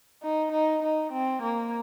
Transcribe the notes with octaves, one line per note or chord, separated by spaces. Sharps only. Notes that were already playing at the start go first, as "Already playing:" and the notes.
D#4
D#4
D#4
C4
A#3